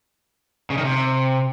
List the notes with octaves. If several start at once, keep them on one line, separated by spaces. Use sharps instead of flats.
C#3
D#3
C3